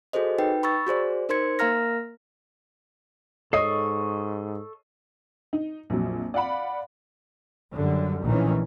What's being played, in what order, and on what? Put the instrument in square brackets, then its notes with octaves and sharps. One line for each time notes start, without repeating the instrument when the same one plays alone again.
[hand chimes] F#4 G#4 A4 C5 D#5
D#4 B4 G5
B5 C#6 E6 A6
F#4 G#4 C5 D5
D#4 A#4 C5 C6 G#6 C#7
A#3 A#4 F5 A#5 F6 A#6
[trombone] G#2 [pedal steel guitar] A4 C#6 [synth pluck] C#5 D#5 [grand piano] D#6 C7
[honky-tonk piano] D#4
A#1 F2 F#3
D5 F5 F#5 B5
[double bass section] F#2 D3 G3
A#1 A2 D#3 E3 C#4